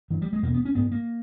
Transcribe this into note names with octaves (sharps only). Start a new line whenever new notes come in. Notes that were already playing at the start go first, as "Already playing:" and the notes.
G2 E3
G3
G#3
E2 B2 A#3
B3
C#4
G#2 B3
A#3